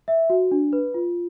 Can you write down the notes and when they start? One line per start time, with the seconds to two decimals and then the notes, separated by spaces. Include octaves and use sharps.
0.08 E5
0.30 F#4
0.51 D4
0.73 B4
0.94 F4